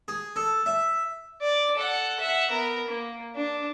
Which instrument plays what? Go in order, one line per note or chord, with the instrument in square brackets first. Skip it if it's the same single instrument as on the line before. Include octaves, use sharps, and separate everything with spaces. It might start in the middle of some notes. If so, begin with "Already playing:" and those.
[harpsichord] G#4
A4
E5
[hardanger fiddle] D5
A4 F#5
E5 F#5
B3 A#4
A#3
D4